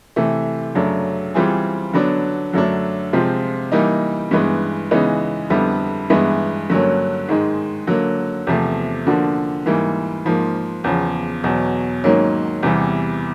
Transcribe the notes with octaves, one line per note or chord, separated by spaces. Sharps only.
C3 E3 A3
F#2 C#3 F#3 A3 D4
E3 G3 C4 F4 G#4
D3 F#3 B3 D4
F#2 D3 F#3 A3 D4
C3 F3 G#3 C4 F4
E3 G3 A#3 D#4
G2 E3 G#3 B3
C#3 E3 G#3 B3 D#4
F2 D3 G3 B3 E4
G2 E3 G#3 B3 E4
G2 D3 F#3 A#3 C#4
G#2 D#3 G#3
D3 F#3 A#3
E2 C3 F3 A3
D3 F3 A#3 D4 F#4
G#2 E3 G3 A#3
G#2 F3 A#3
E2 C#3 F3
E2 B2 F#3
G#2 D#3 F#3 A#3 C#4
E2 C3 E3 G3